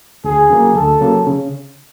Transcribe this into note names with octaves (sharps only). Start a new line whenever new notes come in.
D2 G#4
C#3 F#3 A#3
D2 A4
C#3 F#3 A#3
C#3